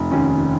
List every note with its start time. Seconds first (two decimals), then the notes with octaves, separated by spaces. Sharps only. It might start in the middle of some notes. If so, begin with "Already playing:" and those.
Already playing: F1
0.11 D#2 D#3 C#4